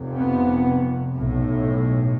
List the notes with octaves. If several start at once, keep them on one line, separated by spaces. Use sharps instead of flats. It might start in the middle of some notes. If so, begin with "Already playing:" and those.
Already playing: F1 F2 C3
B3
B1 A2